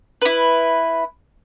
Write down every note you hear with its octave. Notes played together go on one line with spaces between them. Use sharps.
E4 B4